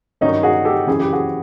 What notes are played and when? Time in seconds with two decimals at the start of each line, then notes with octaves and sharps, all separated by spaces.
0.21 G2 D#3 F#3 C#4 D#4
0.43 F#4 G#4
0.65 G4 A4
0.87 F#2 C#3 E3 G#4
1.00 G4
1.13 F#4 G#4